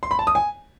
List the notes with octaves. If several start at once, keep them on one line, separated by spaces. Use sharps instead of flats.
C6
B5
A5
D#6
G#5